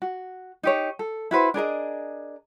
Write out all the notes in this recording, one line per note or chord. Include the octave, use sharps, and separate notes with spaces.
F#4
D#4 G4 C#5
A4
E4 F#4 B4 C5
D4 G#4 A#4 D#5